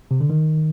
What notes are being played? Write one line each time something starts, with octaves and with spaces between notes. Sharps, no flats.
C3
D3
D#3